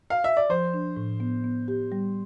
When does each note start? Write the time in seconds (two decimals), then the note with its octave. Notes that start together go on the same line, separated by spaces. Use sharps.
0.10 F5
0.24 E5
0.37 D5
0.49 F3 C5
0.74 D4
0.97 A2
1.20 B3
1.44 B3
1.68 G4
1.92 G3